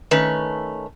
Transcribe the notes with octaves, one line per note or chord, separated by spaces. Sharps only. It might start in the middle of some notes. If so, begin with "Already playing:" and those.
D#3 A3 C#4 B4